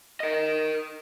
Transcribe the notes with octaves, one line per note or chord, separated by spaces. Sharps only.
A#4 D#5